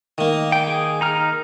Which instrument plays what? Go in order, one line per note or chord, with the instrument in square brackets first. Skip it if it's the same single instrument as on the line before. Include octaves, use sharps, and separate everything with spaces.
[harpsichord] D#3 A#3
[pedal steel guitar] G5
G#4
D#4 A#5 F6